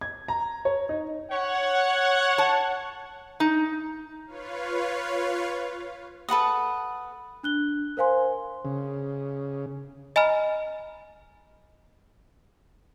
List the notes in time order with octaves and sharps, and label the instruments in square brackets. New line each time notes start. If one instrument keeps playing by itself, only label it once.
[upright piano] G#6
A#5
C#5
D#4
[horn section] C#5 F#5
[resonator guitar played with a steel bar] A5
D#4
[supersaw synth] F4 B4 C#5 F5
[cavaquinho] A4 B4 F#5 D#6
[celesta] D4 F#6 G7
A#4 C5 F5 G#5 C6
[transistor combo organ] C#3
[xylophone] D#5 G#5 A#5 B5 F6